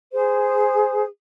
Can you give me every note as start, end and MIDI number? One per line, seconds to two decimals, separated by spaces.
0.12 1.03 68
0.12 1.03 72